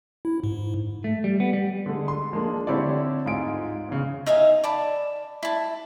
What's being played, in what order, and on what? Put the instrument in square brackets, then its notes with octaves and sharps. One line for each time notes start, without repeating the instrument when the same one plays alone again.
[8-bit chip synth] E4
G#2
[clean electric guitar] A3
G3
B3
G3
[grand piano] D3 G#3
C6
F3 G#3 A#3 D4
D3 C4 E4 G4 C#5 D5
G#2 F4 G#5 D7
E2 C#3
[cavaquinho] D#4 E5 F5 G#5
D5 A5 B5
E4 A5